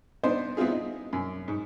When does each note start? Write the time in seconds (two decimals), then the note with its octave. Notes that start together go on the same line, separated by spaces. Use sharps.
0.23 B3 D4 D#4 C5
0.57 B3 C4 E4 F4 G#4
0.71 D#4
1.13 F#2
1.48 G#2